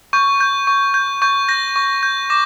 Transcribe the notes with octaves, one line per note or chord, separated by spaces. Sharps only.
C#6 G6
G6
C#6
G6
C#6 G6
G6 A#6
C#6
G6
D6 A#6